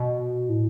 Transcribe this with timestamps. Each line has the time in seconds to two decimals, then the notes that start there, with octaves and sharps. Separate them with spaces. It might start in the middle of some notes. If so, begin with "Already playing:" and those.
Already playing: B2
0.49 A2